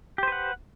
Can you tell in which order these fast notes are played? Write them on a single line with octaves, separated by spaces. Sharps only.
G4 C5 B4 F#5